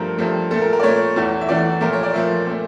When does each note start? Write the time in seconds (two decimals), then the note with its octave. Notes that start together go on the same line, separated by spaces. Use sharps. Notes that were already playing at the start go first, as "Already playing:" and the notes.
Already playing: G2 F3 A3 A#4
0.18 G2 F3 A3
0.51 A#2 A3 A4
0.62 A#4
0.73 A#4
0.79 D5
0.83 A#2 A3 C#5
1.16 E2 E3 A3
1.41 E5
1.48 E2 E3 A3 D5
1.81 A#2 F3 A3 A#4
1.93 C#5
2.03 D5
2.13 A#2 F3 A3 E5
2.46 A#2 A3